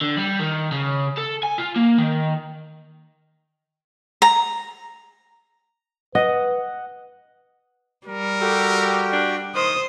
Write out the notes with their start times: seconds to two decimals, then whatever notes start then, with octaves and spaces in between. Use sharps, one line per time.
0.01 D3
0.17 G3
0.40 D#3
0.72 C#3
1.17 A4
1.43 G#5
1.58 F4
1.76 A#3
1.98 D#3
4.22 A#5
6.15 B4 D#5 F#5
8.07 G3 A#4
8.41 F#4 G4 A4 G5
9.13 D4
9.55 D#3 C5 D#6